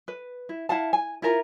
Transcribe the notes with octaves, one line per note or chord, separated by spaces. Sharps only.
B4
E4
E4 F5 F#5 A5
G#5
E4 F4 A#4 A#5